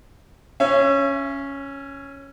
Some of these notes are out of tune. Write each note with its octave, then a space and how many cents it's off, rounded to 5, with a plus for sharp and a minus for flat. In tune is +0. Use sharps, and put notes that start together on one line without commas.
C#4 +0 E5 +40